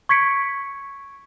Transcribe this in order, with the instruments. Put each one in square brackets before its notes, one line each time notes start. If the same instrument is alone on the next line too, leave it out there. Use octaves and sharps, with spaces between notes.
[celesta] C#6 G#6 B6 C#7 D7